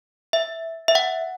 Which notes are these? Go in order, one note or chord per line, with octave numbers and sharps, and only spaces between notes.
E5
E5
F#5